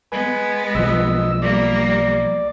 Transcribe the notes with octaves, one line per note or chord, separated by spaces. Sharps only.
G#3 B3 B4 G#5
B1 F3 D#5 E6
G3 A#3 D5